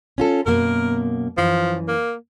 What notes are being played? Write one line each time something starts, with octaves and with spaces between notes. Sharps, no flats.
C#4 F4 A4
F#2 B2 A#3 A#4
F#2 E3 F3
A#3